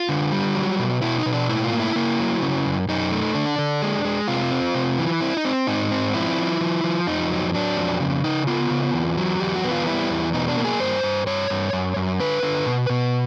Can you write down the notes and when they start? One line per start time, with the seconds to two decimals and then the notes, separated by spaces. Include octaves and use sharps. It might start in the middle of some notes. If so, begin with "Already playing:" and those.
Already playing: F4
0.09 D3
0.32 G3
0.56 F#3
0.79 B2
1.02 B2 E4
1.18 D#4
1.26 B2
1.33 D4
1.49 A2 E4
1.64 F4
1.72 A#3
1.80 E4
1.96 A#3
2.19 F#3
2.42 C#3
2.65 F#2
2.88 F#2 D#4
3.12 A3
3.35 D3 D4
3.59 D3
3.82 G#3
4.05 G#3
4.28 C3 F4
4.51 C4
4.75 C3
4.98 E3
5.21 C4 E4
5.37 D#4
5.45 C4
5.67 G#2 D#4
5.91 C4
6.14 F3 E4
6.38 F3
6.61 F3
6.84 F3
7.07 F2 D#4
7.31 F#3
7.54 F#3 D4
7.78 F2
8.00 C#3
8.24 C#3 D#4
8.47 B3 F4
8.70 C#3
8.94 E2
9.17 F#3
9.40 E2 G4
9.56 F#4
9.63 B3
9.71 F4
9.86 G3 E4
10.10 E2
10.33 B2 D#4
10.48 D4
10.57 A#3
10.65 G#4
10.80 G2 C5
11.03 G2
11.27 G2 C#5
11.50 G2
11.73 F#2
11.96 F#2
12.20 D3 B4
12.43 D3
12.66 B2
12.90 B2